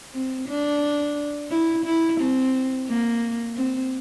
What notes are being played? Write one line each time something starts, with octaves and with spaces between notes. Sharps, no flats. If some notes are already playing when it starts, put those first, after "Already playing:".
C4
D4
E4
E4
C4
A#3
C4